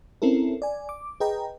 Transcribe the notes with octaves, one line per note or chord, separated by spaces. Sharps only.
C4 C#4 E4 A4 A#4
D5 G#5
D6
G#4 B4 D#5 G5 A#5